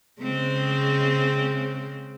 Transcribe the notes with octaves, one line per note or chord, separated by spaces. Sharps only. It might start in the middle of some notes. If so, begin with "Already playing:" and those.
C#3 G#3 C4